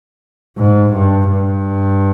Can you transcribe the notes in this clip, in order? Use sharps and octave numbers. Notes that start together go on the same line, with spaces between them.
G#2
G2
G2